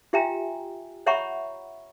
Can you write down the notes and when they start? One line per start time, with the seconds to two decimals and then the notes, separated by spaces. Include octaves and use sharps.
0.13 F4 G4 E5 G5 G#5 A#5
1.06 C#5 E5 F#5 A#5 B5 C#6